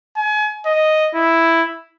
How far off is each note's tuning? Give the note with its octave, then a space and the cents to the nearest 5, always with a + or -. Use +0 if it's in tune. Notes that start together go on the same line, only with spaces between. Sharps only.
G#5 +35
D#5 +0
E4 +0